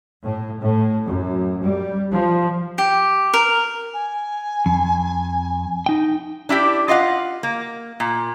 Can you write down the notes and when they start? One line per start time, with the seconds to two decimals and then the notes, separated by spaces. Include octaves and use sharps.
0.24 A2
0.61 A2
1.06 F#2
1.60 G3
2.12 F3
2.78 G4
3.34 A#4
3.93 G#5
4.66 F2
5.86 D#4 G5
6.49 D4 E4 F4 G4
6.88 F4 D#5 F5 F#5
7.43 A#3
8.00 A#2